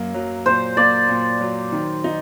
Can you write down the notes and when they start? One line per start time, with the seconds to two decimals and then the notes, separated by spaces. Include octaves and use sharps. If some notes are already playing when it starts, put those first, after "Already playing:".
Already playing: F#2 A#3
0.14 F#3
0.46 A#2 C5
0.77 A#3 D5
1.09 A#2
1.41 F#3
1.72 D#3
2.04 D#4